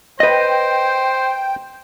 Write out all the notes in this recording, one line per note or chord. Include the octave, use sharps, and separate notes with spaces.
B4 C5 D#5 G5